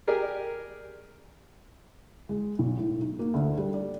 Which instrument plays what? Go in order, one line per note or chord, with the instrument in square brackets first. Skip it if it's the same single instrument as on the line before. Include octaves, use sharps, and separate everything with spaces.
[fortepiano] G4 G#4 A#4 D5
[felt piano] G#3
B1
A2
D#4
A#3
D2
G3
D5